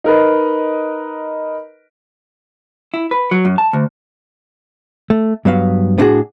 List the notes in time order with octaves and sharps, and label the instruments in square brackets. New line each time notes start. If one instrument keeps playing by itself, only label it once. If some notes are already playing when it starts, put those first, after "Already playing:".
[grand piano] D#4 A#4 B4 D#5
[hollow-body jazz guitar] E4
B4
F#3
F#2
A5
D2
A3
G2 F#3 B3 F5
A2 B3 D4 D#4 F#4 G#4